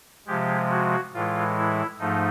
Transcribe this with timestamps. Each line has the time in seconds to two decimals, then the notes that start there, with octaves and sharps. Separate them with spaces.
0.27 C3 F3 G#3 G4
0.70 F#4
1.13 A2 E3 G#3 F4
1.56 E4
1.99 G#2 F3 A3 D#4